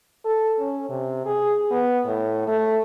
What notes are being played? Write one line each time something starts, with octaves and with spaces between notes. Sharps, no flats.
A4
C#4
C3
G#4
B3
A2
A3